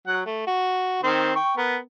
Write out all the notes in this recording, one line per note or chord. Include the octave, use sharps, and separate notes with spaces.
F#3 F#5
A3
F#4
D#3 C4 C5
G5 C#6
B3 A#4